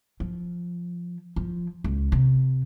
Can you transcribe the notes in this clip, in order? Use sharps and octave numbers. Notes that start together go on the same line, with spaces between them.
F3
F3
C#2
C3